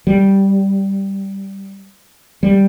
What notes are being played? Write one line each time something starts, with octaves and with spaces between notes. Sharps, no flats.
G3
G3